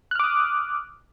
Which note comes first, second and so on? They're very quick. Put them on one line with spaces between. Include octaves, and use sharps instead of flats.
F#6 F6 D6 D#6